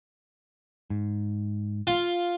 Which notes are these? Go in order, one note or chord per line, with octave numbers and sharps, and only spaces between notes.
G#2
F4